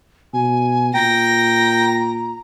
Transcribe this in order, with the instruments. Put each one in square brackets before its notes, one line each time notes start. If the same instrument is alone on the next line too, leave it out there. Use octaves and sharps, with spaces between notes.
[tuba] B2 [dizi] G#5
[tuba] A#2 [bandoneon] G5 [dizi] A#5 [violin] A#6